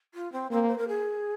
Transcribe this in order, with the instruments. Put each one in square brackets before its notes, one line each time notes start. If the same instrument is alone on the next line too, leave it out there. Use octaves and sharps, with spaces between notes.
[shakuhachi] F4
C4
[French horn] A#3 [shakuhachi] C4
[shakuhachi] C5
A#4
G#4